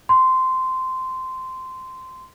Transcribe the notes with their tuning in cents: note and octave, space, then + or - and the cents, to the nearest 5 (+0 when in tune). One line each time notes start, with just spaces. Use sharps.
C6 -15